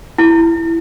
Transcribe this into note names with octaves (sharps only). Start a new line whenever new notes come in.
E4